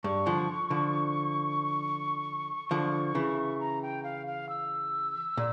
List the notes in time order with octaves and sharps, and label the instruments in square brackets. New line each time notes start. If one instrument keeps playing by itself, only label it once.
[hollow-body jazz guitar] G2 [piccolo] C#6
[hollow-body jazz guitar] D3 F3
D3 F3
D3 F3
C#3 E3
[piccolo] A#5
G5
F5
F5
E6
[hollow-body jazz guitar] A#2